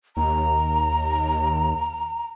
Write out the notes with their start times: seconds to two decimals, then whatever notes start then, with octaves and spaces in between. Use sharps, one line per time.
0.17 D#2 A#5